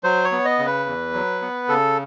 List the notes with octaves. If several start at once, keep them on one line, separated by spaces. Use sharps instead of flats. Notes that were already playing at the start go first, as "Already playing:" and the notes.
F#3 C5
C#5
B3
D#5
C#3
B4
E2
F#3
B3
C#3 A4